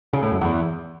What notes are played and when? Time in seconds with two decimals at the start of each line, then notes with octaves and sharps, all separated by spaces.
0.13 C#3
0.23 A2
0.32 F#2
0.41 E2